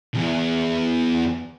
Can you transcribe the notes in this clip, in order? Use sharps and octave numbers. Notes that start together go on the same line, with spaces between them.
B1 E2